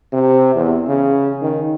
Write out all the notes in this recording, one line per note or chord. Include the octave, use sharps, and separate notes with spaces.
C3
E2
C#3
D#3